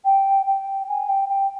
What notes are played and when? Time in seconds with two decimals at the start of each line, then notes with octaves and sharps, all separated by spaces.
0.04 G5
0.46 G5
0.88 G#5
1.08 G5
1.28 G5